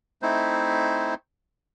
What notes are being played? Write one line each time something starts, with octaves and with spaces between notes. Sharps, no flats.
A3 C4 D#4 E4 C5